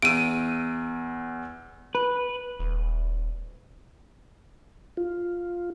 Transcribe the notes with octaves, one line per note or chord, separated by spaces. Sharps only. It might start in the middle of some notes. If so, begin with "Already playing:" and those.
E2 E6 D7 D#7
B4
D#1
F4